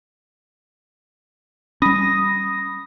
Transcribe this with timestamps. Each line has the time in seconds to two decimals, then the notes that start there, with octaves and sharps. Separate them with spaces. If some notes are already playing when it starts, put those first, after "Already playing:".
1.82 G3 C#4 B5 D#6 A#6